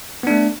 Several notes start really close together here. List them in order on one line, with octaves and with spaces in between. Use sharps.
B3 D4 A3